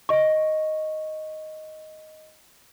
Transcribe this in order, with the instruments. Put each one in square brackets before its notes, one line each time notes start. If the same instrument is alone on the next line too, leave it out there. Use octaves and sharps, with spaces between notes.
[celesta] D#5 C#6